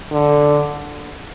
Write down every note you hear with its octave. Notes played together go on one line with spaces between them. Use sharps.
D3